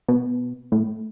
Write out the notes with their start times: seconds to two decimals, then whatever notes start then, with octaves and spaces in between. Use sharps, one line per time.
0.08 B2
0.72 A2